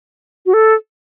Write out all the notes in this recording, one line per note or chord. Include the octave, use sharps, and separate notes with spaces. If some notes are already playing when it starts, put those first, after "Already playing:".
F#4
A4